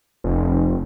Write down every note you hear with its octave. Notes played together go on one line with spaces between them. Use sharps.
F1